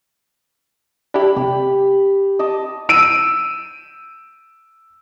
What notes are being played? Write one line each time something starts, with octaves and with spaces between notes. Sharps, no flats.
D4 E4 G4 B5
C3 G4
D#5 A5 D6
E6 D7 D#7